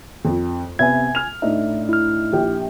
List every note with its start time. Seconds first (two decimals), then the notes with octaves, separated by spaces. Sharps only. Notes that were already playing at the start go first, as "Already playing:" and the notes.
0.25 F2
0.79 C3 B3 E5 G#5 G#6
1.15 F6 F7
1.42 A2 D4 D#4 E5
1.89 E4 F6
2.33 A#1 G4 G5